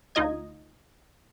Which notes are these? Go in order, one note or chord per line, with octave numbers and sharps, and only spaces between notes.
D2 D#4 F4 D#5 G#6